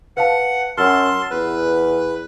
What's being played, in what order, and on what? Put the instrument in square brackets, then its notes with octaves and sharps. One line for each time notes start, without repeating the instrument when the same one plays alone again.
[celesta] B4 F5 A5 [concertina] F#5
[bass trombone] F#2 [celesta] F#5 E6 F6 [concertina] A5 C6
[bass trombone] E2 [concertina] B4